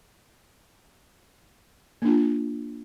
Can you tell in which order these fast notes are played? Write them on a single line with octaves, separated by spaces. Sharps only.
A#3 D4 F4